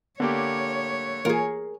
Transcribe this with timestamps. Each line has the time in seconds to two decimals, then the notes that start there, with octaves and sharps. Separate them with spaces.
0.20 D3 A#3 B3 G4 C#5
1.25 E3 A#3 F4 G#4 A#4